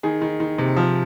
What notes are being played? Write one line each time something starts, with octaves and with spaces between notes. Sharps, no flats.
D#3 G#4
D#3
D#3
C3
F3